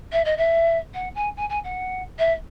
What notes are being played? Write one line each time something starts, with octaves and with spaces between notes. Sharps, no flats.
E5
D#5
E5
F#5
G#5
G#5
G#5
F#5
E5